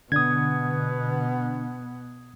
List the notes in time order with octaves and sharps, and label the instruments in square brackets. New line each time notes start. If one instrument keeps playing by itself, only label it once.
[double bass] B2 B3 [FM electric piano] D3 D4 [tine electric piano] D#6 G#6